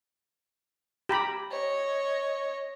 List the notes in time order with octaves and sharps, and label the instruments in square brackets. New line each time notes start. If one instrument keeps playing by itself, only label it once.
[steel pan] G4 A#5 B5
[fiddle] C#5 D#5